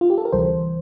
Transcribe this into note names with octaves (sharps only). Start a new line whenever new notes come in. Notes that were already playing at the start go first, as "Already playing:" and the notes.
F4
G4
A4
A#4
D2 C3 E3 G3 C5